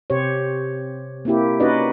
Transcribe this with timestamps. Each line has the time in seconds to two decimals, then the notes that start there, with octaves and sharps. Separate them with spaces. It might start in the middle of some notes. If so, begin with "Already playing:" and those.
0.10 C3 G4 C5 C#5
1.25 A#3 C4 E4 G4
1.60 C#4 D#4 F#4 B4 D5 D#5